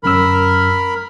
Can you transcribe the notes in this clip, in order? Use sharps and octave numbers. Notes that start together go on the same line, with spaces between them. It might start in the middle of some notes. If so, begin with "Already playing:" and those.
G1 F#2 A#4 B5 E6